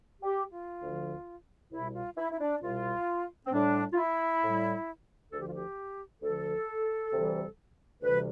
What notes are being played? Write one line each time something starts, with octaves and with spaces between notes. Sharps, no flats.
G4
F4
D2 D3 F3
C2 B2 G3 E4
F4
E4
E4
D4
C2 B2 G3 F4
C4
A2 G3 D4
F4
E4
A2 G3
D2 D3 F3 A4
G4
F4
G4
D2 D3 F3 A4
D2 C3 E3 G3
D2 C3 E3 G3 B4